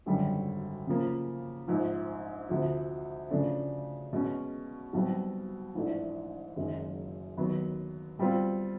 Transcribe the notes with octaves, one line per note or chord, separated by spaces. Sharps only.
G#1 F#2 D3 G3
C#3 F3 A#3
A#1 G#2 F3
D2 C3 F3
C#3 F3 A3 D4
B2 G#3 C#4
B1 B2 G3 C4
A#1 G#2 E3 A3 D4
F#1 F#2 D#3 G#3
D#2 D#3 F#3 B3
B2 G3 C4 F4